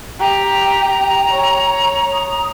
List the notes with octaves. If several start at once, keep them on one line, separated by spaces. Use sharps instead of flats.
G4 G5 A#5
C#5
D#6